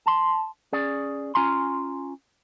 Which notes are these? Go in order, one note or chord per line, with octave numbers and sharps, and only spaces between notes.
A5 C6
C#4 G#4 D5
C#4 F4 G#5 A#5 C6